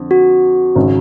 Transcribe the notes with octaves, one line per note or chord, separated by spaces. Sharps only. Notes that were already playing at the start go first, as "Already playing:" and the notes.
Already playing: F2 D3
F#4
G#1 C#3